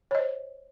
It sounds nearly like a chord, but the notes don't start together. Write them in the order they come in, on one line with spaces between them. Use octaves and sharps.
C#5 D#5 C5